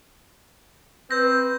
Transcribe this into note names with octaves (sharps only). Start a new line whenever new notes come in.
C4 B4 G6 A#6